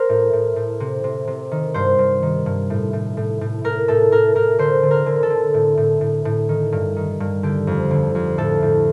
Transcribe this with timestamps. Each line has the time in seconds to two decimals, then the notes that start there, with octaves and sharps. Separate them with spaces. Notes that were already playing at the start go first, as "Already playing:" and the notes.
Already playing: A#4 C5
0.09 A2
0.33 A2
0.56 A2
0.80 C3
1.04 C3
1.27 C3
1.51 D#3
1.74 G2 C5
1.99 G2
2.22 D#3
2.46 G2
2.70 A2
2.93 A2
3.17 A2
3.41 A2
3.64 A2 A#4
3.88 A2 A4
4.12 A2 A#4
4.35 A2 A#4
4.59 D3 C5
4.83 D3
4.91 A#4
5.06 D3
5.23 A4
5.30 D3
5.54 A2
5.77 A2
6.01 A2
6.25 A2
6.49 D#3
6.72 G2
6.97 D#3
7.20 G2
7.43 D3 G4
7.67 F2
7.91 D3
8.15 F2
8.38 A2 A4
8.62 A2